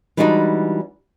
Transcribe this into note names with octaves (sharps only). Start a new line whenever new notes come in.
E3 G3 G#3 D4 D#4 F#4